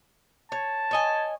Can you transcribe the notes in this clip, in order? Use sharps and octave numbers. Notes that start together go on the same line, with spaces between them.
C#5 A5
C#5 D#5 G#5